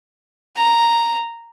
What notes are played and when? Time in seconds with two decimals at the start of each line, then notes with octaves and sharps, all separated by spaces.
0.56 A#5